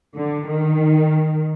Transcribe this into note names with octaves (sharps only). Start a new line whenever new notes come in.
D3
D#3